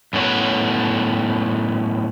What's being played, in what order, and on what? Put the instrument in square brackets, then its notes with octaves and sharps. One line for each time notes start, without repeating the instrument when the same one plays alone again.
[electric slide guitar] F#2 A2 B3 C#5 F#5